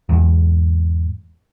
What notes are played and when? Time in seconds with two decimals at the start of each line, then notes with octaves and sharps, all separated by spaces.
0.09 E2 G#2